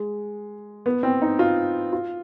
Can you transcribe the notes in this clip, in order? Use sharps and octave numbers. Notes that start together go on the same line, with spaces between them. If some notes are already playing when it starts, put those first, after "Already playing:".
Already playing: G#3
B3
C4
D#4
F4
F4